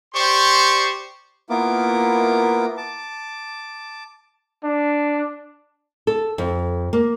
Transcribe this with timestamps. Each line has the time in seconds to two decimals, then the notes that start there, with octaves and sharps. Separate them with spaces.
0.14 G4 C5 D5 C6 C#6
1.50 A#3 B3 E4 F4 A#4 D6
2.77 A5 D6
4.64 D4
6.07 A4
6.38 F2
6.93 A#3